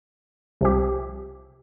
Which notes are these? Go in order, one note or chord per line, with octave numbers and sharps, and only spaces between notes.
C2 C3 F3 C4 G4